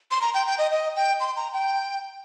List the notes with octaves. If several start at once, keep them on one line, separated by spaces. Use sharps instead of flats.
C6
A#5
G5
G5
D#5
D#5
G5
C6
A#5
G5